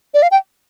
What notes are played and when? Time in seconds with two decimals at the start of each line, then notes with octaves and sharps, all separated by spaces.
0.14 D5
0.23 F5
0.31 G5